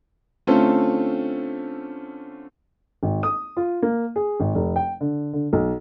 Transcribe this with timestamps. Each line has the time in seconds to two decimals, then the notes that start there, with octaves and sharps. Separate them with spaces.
0.47 D3 A3 C4 C#4 F4 A4
3.03 G#1
3.23 D#6
3.57 F4
3.82 A#3
4.16 G#4
4.40 G#1
4.55 F1
4.76 G5
5.01 D3
5.33 D3
5.53 B1